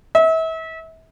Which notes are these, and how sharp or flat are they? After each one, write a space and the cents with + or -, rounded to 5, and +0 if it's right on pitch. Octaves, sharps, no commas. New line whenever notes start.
E5 -35